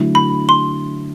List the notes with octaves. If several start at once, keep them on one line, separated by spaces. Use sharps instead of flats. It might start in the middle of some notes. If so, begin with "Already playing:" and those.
Already playing: D3 F#3 A3 E4
B5
C6